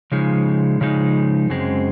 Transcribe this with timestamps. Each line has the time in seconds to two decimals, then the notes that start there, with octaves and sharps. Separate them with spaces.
0.12 C#3 F3 G#3 D#4
0.81 C#3 F3 G#3 D#4
1.50 F#2 C#3 G#3 C4